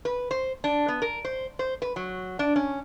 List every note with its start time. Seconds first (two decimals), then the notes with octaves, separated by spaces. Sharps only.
0.05 B4
0.31 C5
0.64 D4
0.88 B3
1.02 A#4
1.25 C5
1.59 C5
1.82 B4
1.96 F#3
2.39 D4
2.56 C#4